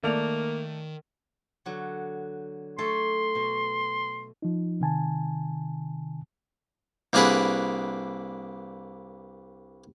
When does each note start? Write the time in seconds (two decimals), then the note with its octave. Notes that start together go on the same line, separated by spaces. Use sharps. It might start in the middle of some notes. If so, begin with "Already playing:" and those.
0.04 D#3 A3 A#3 D5 F7
1.66 D3 F#3
2.78 A3 A4 C#5 C6
3.35 B2
4.42 F3 D#4
4.80 C3 D#3 G#5 A5
7.13 C2 A#3 D4 G#4 B4 F#5